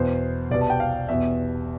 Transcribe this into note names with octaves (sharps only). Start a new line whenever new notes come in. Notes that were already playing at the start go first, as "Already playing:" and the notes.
Already playing: E2 B2 C5
C2 B2 D5
A5
G5
F5
E2 B2 E5